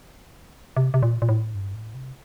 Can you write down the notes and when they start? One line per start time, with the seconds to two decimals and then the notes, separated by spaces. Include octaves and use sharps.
0.77 C3
0.94 C3
1.03 A#2
1.22 A#2
1.29 A2
1.55 G2
1.74 A2
1.94 C3